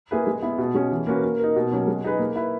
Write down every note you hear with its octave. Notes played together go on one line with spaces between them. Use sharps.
A#3 E4 G#4 B4
G#3
B3 E4
B2
G#3 C#4
E3
A#3 C#4 F#4 B4
A#3
D#4 A#4
B2
F#3 A#3 C#4
G#3
D#4 G#4 B4
A#3
E4 B4